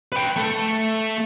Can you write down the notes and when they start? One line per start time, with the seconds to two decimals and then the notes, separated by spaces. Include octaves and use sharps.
0.12 B4 G5
0.36 A3 A4